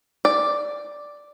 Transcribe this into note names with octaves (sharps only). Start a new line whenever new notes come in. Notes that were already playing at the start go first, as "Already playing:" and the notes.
D5